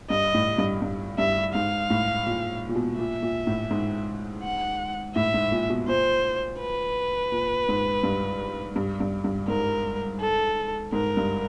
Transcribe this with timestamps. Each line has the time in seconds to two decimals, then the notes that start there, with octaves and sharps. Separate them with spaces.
0.10 G2 D#5
0.34 A2
0.58 G2
0.82 G2
1.18 G2 E5
1.54 G#2 F5
1.90 A2
2.26 A#2
2.69 A#2
2.75 B2
2.99 A#2 E5
3.22 A#2
3.47 A2
3.71 G#2
4.43 F#5
5.15 A2 E5
5.34 G#2
5.52 A#2
5.70 B2
5.88 A#2 C5
6.60 B4
7.32 A#2
7.69 G#2
8.03 G2
8.76 G2
9.00 G2
9.24 G2
9.48 G#2 A#4
10.20 A4
10.92 G#2 A#4
11.17 G2